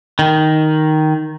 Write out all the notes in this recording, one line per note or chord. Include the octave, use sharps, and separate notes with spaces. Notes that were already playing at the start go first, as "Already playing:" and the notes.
D#3